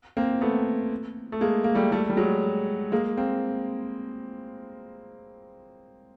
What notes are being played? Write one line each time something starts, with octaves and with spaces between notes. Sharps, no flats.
A#3 C4
A3 B3
A3
G#3 A#3
A#3
G3 A3
G3 A3
G3
F#3 G#3
G#3 A#3
A#3 C4